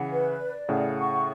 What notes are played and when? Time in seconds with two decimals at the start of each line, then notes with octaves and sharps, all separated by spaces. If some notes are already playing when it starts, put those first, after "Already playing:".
Already playing: C#3 E3 F#5
0.11 B4
0.40 D5
0.69 A2 C#3 F#5
0.99 C#6